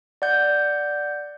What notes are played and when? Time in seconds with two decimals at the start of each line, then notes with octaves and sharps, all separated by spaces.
0.22 D5 F#5 G6